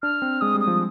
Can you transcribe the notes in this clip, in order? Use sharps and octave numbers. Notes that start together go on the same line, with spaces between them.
D4 F6
C4
G#3 D#6
G3
D#6
F3